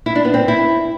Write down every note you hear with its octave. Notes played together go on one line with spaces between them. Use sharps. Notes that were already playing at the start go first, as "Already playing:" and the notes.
E4
D4
B3
C4
E4